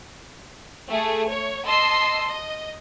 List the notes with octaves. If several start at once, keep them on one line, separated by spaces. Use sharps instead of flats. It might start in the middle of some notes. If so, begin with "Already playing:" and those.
A3 G#4
C#5
D#5 A5 C6 E6 C7
D#5